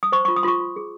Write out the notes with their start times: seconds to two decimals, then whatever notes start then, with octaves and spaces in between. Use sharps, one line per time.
0.03 D#6
0.12 C5 C#6
0.25 C#6
0.28 F4
0.36 D#6
0.43 F4 C6 C#6
0.60 F4
0.76 G#4